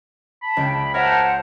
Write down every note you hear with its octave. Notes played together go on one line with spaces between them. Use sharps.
A5 B5
C#2 G5 D7
A#4 C5 C#5 E5 F#5 A5